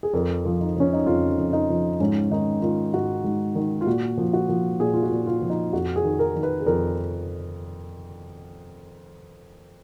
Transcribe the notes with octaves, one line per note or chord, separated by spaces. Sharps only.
G#4
F2 A#4
F3
D#4
F3 C#4
D#4
F2 F4
F2
D#4
F3
G#2 C#4
D#3 D#4
D#3 F4
G#2 F#4
G#2
D#3
F4
A#2 F#4
F3
F#4
F3
A#2 G#4
F4
F#4
A#2
F4
F3
D#4
F2 F#4
G#4
D#3
A#4
D#3
B4
G#4
F2 A#4